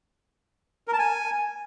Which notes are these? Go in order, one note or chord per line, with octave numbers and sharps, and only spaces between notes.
A#4
A5
G#5